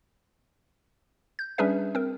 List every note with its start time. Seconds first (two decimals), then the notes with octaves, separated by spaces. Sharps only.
1.39 G6
1.58 G3 C#4 D4 G#4 B4 E5
1.95 C4 A#4